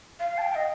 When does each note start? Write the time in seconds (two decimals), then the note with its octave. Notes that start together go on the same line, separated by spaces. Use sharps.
0.20 F5
0.38 A5
0.41 G5
0.55 D#5